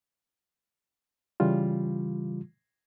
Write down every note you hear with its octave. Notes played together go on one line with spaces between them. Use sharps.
C#3 E3 G3 F4